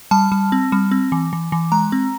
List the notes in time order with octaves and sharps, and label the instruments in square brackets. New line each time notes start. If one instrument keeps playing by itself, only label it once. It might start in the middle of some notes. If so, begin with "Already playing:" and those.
[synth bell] G3 A5
G3
C4
G3
C4
E3
E3
E3
G#3 A#5
C4